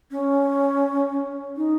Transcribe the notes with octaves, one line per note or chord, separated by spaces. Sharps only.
C#4
D#4